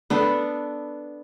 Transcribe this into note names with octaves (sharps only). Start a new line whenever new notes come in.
B3 D4 A4